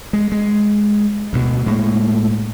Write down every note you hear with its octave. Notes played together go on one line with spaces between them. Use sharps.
G#3
G#3
D2 B2
A2 G#3 A#3